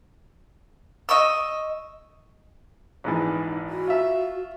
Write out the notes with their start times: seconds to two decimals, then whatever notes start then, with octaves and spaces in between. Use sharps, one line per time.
1.09 D#5 C#6 E6
3.04 A#1 G#2 E3 D#4
3.70 F#4
3.88 F4 E5